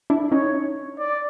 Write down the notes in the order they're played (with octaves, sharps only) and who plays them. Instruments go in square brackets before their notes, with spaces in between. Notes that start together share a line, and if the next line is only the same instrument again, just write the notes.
[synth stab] D4 E4
[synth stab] C#4 D#4 [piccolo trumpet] C#5
[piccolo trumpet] D5